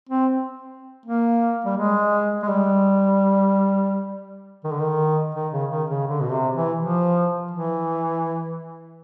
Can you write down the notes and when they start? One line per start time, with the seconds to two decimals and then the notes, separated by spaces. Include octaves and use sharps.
0.09 C4
1.06 A#3
1.65 G3
1.77 G#3
2.43 G#3
2.48 G3
4.64 D#3
4.72 D3
4.80 D#3
5.35 D#3
5.53 C#3
5.71 D#3
5.90 C#3
6.08 D3
6.21 B2
6.31 C3
6.55 E3
6.78 F3
7.51 E3